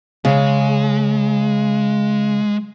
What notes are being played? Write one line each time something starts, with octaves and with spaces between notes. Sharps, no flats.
C#3 G#3